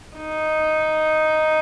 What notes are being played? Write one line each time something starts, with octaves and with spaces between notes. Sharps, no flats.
D#4